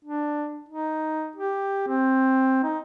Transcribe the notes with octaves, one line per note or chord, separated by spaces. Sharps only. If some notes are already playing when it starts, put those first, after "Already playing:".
D4
D#4
G4
C4
D#4